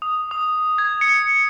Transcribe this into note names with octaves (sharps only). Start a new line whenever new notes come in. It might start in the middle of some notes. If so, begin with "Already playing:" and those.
D#6
D#6
G#6
C#7